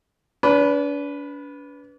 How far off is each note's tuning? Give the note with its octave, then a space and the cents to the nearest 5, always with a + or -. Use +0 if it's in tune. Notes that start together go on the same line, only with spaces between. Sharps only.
D4 -40 B4 +0